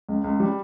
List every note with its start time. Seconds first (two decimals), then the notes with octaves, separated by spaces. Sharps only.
0.09 C#2
0.24 C#2
0.40 G3